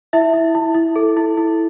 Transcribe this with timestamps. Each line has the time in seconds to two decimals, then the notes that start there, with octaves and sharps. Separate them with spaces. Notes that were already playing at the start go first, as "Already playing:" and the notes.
0.13 E4 E5
0.33 E4
0.55 E4
0.74 E4
0.96 A4
1.17 E4
1.37 E4